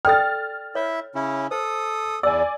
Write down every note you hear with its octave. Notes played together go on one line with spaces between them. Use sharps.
A4 D5 G5 F6 A6
E4 C#5 E5
C#3 C#4 E4
A4 C5 D#6
E2 D5 G#5 E6